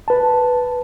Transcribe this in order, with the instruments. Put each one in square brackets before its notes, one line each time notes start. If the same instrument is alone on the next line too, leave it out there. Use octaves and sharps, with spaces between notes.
[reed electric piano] B4 A5